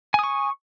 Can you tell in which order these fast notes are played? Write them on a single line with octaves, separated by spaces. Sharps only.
G#5 D#6 C#6